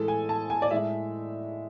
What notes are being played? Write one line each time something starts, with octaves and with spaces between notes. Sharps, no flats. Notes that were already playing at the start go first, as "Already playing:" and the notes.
Already playing: A2 E3 G#3 A4
G#5
A5
G#5
D5
A2 G#3 E5